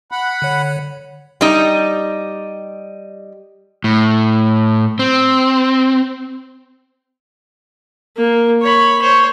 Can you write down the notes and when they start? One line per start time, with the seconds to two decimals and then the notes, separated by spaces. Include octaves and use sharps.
0.12 F#5 B5
0.42 D3 C#5
1.41 G3 D#4
3.84 A2
4.99 C4
8.16 A#3
8.61 C#5 B5
9.02 C5 C#5